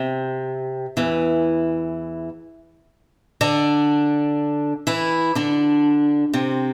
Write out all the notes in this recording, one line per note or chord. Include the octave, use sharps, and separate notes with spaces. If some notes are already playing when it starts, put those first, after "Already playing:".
Already playing: C3
E2 E3
D3 D4
E3 E4
D3 D4
C3 C4